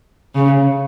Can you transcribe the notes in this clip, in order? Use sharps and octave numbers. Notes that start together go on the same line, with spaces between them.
C#3